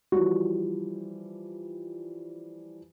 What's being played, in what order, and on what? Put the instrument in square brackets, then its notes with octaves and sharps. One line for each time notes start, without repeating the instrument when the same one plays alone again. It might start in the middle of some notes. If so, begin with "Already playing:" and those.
[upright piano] E3 F3 G3 [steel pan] F#4